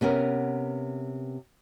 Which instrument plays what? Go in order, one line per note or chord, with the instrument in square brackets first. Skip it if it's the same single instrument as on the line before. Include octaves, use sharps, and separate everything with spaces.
[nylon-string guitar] C3 B3 C#4 A#4